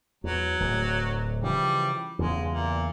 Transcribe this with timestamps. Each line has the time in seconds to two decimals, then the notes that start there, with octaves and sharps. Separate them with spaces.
0.24 E2 F#3
0.60 D1 D3
1.43 C#3 E3 F3 G3
2.19 E2 G2 C#3 G#3
2.52 A#2